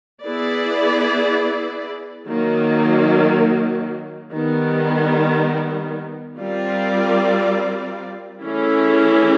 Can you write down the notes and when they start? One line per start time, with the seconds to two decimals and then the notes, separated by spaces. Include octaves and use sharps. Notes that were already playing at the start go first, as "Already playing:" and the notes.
0.22 B3 E4 G#4 B4 D5
2.27 D#3 F#3 A#3
4.33 D#3 G3 B3
6.39 G3 C4 F4 A#4 D5
8.44 E3 A3 C#4 E4 G#4